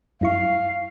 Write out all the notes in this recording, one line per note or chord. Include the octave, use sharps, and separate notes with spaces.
F#2 E4 F5 C#6